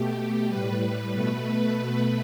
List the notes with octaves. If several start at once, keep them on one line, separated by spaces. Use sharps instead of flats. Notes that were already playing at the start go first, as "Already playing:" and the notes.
Already playing: B2 A3 G4
A2 G3 B4
B2 A3 B4
B4
B2 A3 B4